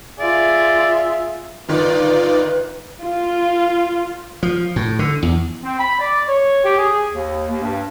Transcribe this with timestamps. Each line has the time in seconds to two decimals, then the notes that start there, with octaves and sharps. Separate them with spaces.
0.20 F4 G#4 D5 E5
1.69 G1 D#3 D#4 F4 B4 D5
3.02 F4
4.43 F3
4.76 A2
4.99 D3
5.22 E2
5.64 C4
5.79 B5
5.99 D5
6.28 C#5
6.64 G4
6.78 G#4
7.13 D#2
7.50 D#2
7.62 G2